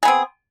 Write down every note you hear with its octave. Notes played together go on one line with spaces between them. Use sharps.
B3 C4 G#4